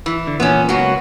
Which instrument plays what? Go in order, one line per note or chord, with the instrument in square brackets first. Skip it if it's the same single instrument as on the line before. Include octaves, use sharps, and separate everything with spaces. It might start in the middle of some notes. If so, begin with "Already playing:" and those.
[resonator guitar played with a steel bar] E3
[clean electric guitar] D3
[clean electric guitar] E2 A#2 [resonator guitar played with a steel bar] B3 C#4
[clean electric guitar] C#2 A#3 B3 [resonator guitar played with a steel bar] F#3 F#4